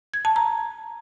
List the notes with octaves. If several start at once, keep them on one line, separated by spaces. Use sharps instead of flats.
G#6
A5
A#5